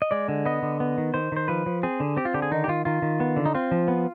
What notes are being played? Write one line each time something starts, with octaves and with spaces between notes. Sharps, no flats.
D#5
G#3 D5
D3
B3 D#5
D3
B3
D#3
D#3 C5
D#3 C5
F3 B4
F3
C4 G#4
D3
C4 G4
F4
D3 G4
G#4
D#3 D#4
G4
D#3 F4
D#3 F4
D#3
B3
D3
D#4
C4 F4
F3
B3